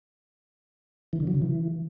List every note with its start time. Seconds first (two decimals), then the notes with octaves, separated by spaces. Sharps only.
1.13 E3
1.20 D3
1.27 F#3
1.35 C#3
1.42 E3